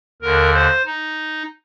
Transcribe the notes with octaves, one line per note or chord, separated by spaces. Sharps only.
D#2 D3 A#4
C5
D#4